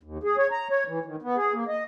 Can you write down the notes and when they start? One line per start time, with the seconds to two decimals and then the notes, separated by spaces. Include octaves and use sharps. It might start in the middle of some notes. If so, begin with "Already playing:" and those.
0.03 D#2
0.23 G#4
0.37 C#5
0.51 A#5
0.70 C#5
0.88 E3
1.05 D#3
1.22 B3
1.36 G#4
1.53 A#3
1.68 D#5